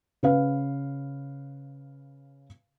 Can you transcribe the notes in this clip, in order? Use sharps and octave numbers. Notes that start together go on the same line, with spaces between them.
C#3 B4 F5